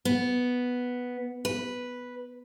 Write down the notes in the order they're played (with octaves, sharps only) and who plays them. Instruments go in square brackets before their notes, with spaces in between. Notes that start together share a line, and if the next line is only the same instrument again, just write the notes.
[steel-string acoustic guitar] B3
B4